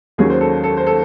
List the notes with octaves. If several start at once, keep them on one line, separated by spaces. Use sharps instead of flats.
D#2 D#3 F#3 C#4 G#4
C5
A4
A4
C5
A4